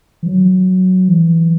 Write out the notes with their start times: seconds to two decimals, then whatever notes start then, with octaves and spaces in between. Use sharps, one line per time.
0.23 E3
0.26 F#3
1.08 E3